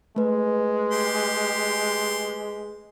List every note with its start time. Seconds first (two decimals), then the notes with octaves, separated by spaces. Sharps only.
0.16 G#3 A3 B4
0.92 G4 C6